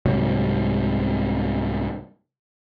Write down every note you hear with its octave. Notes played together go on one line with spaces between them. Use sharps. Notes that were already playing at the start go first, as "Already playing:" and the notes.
C2 G#2 C3 F#3